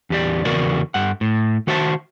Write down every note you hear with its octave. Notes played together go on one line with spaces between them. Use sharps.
E2 G4 D5
E2 C#3 F#4 A#4 D5
G2 F#5
A2
D#3 F#4 C5 E5 A5